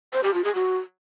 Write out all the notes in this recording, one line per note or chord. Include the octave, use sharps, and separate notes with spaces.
C5
G4
F4
G#4
F#4